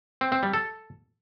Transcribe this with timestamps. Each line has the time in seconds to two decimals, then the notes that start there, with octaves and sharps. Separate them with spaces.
0.21 C4
0.32 C4
0.43 G3
0.54 A4